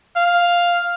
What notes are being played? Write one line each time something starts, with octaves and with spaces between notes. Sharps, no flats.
F5